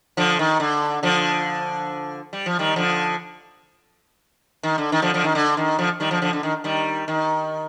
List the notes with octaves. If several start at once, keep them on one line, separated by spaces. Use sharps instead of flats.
D3 F3
D#3
D3
D3 F3
G3
F3
D#3 G3
D3 F3
D#3
D3
D#3
D3 F3
D3 F3
D#3
D3
D#3
D3 F3
D#3 G3
D3 F3
D3 F3
D3
D#3
D#3 G3
D#3